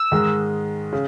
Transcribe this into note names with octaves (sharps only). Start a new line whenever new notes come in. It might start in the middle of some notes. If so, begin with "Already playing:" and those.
Already playing: E6
G#2 D#3 G#3
C#3